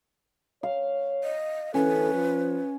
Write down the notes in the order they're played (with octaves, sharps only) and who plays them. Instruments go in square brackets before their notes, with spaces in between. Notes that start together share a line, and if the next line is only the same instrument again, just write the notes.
[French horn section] C#5 [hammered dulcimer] F5
[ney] D#5
[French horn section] D2 E3 A4 [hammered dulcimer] C#4 [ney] B4
[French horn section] F3